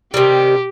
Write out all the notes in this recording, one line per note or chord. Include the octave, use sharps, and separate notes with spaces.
C3 D#3 G3 G4